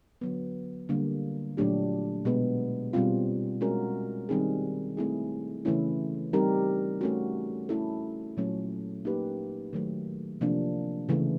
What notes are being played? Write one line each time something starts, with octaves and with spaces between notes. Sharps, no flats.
D3 F#3 B3
D3 G3 A#3
A#2 F#3 A3 D4 G4
B2 G#3 B3
B2 G3 C4 F4
G#3 C#4 F#4 A#4
D#3 G3 C4 D#4 G#4
A3 C4 E4 G#4
C#3 E3 A3 C#4 E4
G3 C4 D#4 G4 A#4
A3 C#4 F#4
A3 C#4 E4 A4
A#2 F#3 A3 C#4
A#3 D#4 G4 B4
D#3 F#3 A3
C3 F3 A#3 D4
C#3 E3 A3